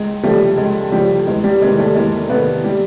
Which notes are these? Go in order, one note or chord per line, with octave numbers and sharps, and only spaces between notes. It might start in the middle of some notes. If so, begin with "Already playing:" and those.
Already playing: C#2 G#3
C#3 F3 G3 A3
C#2 G#3
C#3 F3 G3
E2 G#3
G3
C3 D#3 G#3
G3 A3
E2 G#3 A#3
C3 D#3 A3 B3
G3